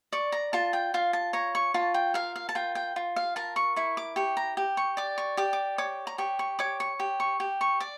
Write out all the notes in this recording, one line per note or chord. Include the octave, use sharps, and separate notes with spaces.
D5 C#6
A#5
F4 A5
G5
F4 F5
A5
C#5 A#5
C#6
F4 A5
G5
A#4 F5
F5
A5
F4 G5
G5
F4
F5
A#4 A5
C#6
E4 C#6
D6
G4 C#6
A#5
G4
C#6
D5 D6
C#6
G4 D6
D6
C#5 D6
A#5
G4 C#6
C#6
C#5 D6
C#6
G4
C#6
G4
C#6
D5 D6